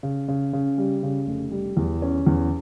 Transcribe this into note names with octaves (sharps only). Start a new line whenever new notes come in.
C#3
C#3
C#3
G3
C#3
F1
G3
E2
C#4
E2